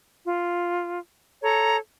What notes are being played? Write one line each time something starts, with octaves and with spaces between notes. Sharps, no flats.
F4
A4 C#5 A#5